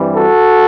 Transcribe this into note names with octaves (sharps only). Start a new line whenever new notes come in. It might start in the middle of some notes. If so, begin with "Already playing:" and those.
Already playing: G2 E3 G3 C4
F#4 A4